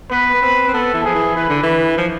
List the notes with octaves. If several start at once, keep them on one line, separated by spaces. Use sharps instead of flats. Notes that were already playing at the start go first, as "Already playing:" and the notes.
B3 B4
B3
C4
C4
B3 A4
E3
F3 G#4
E3
E3 B4
D3
E3
F3